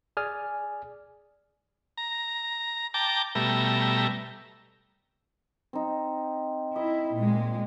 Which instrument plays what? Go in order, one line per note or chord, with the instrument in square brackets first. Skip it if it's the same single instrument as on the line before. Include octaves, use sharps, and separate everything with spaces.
[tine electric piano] G#4 D5 G#5 F6
[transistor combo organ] A#5
G5 A5 A#5 D6
B2 G3 A3 E5 A#5
[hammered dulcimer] C4 D#4
[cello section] E4 [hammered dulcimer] D#5
[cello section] A#2 G#3